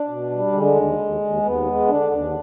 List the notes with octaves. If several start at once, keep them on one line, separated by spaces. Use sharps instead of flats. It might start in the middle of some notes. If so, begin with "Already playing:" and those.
Already playing: D4
B2
G3
D3 G#3
D#2
D#2
D#2
D#2 B3
G#3
D3 D4
D#2